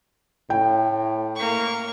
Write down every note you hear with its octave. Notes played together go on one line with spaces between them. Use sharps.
A2 G5
A#3 C#6